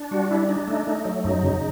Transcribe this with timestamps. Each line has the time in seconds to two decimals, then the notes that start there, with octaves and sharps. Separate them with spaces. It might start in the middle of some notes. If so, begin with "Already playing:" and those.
Already playing: D4
0.11 G3 F#4
0.31 D4 E4
0.49 D4 D#4
0.68 A3 D#4
0.87 A3 D#4
1.05 F#3
1.24 F#2 D#4
1.43 C#3